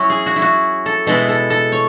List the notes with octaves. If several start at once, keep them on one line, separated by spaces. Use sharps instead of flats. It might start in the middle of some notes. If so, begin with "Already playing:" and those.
Already playing: F#3 C#4 E4 F#4
G#4
F#4
E4
F#4
A4
B2 G#3 B3 E4 A4
A4
A4
C#5